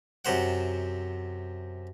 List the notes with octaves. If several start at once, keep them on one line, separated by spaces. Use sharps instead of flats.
F#2 C3 C5 F#5